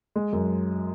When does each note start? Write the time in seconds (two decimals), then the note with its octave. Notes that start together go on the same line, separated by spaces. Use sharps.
0.16 G#3
0.33 F#2